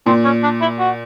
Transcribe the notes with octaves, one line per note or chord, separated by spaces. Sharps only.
A#2 C4
C#4
D4
E4
F#4